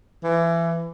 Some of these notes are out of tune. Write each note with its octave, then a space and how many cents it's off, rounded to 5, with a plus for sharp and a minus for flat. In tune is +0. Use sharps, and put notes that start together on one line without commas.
E3 +25